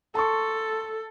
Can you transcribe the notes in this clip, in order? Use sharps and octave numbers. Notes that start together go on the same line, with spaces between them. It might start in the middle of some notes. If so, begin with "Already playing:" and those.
A4 A5 C6 C#6